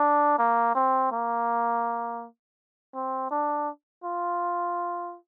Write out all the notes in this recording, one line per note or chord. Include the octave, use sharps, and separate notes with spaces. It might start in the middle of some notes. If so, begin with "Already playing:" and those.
Already playing: D4
A#3
C4
A#3
C4
D4
F4